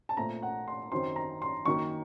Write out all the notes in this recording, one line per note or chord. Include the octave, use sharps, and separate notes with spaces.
A5
A#2 A3 C4 A#5
F#5
C6
F#2 D#3 F#3 C4 C6
A#5
C6
F#2 D#3 F#3 A#3 C#6